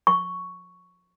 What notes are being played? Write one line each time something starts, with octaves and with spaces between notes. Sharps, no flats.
C#6